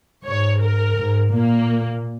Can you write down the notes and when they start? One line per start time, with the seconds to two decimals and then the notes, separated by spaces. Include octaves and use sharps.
0.25 G#2 C#5
0.61 A#4
0.97 G#2
1.32 A#2 A#3